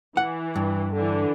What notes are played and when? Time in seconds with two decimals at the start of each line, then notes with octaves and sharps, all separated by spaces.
0.17 E3 F#5
0.56 G2
0.94 D3 E3